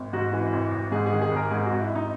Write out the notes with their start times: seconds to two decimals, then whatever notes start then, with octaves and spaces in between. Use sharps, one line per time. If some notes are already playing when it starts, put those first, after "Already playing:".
Already playing: G#1
0.13 G#2 F#4
0.33 E3
0.53 G#1
0.71 G#1
0.92 G#2 G#4
1.06 G#4
1.12 D#3
1.22 G#4
1.31 G#1
1.36 A#4
1.51 G#2 G#4
1.66 G#1 F#4
1.81 E4
1.90 G#1
1.95 D#4